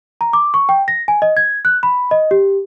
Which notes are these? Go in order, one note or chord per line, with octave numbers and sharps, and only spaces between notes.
A#5
D6
C#6
G5
A#6
G#5
D#5
G#6
F#6
B5
D#5
G4